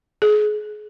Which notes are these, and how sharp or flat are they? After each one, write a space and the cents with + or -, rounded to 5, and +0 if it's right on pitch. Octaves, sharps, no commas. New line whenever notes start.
G#4 +30